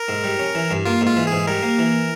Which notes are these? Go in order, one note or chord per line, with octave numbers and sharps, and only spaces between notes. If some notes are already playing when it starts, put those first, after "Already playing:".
Already playing: A#4
G#2
G3
C#4
E3
G2
A#3 F4
G#2
F4
E3
G#4
G#2
G3 A#4
A#3
E3